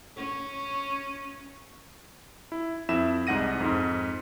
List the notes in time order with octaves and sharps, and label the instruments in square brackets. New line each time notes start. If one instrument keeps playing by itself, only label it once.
[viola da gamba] C#4
[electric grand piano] E4
F2 E4 E5 E7
C2 G#2 D#4 F#5 A#6 D#7
F2 G#2